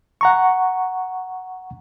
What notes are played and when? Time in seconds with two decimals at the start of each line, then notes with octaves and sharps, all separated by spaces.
0.21 F#5 A#5 C#6